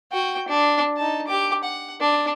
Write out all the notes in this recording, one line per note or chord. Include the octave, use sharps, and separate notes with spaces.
F#4 G5
D4
D#4 A5
G4 D6
F#5
D4